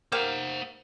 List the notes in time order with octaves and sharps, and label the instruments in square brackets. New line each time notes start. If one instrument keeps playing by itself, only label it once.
[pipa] A#3 G4 F5 [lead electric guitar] C5 F#5